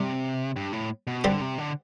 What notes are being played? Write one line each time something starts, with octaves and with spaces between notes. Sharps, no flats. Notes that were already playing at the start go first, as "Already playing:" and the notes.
Already playing: C3 G3
G2
A2
B2
D3 G3 C4 G4
C3
D3